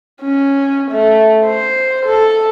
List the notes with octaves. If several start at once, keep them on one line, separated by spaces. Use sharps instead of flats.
C#4
A3
C5
A4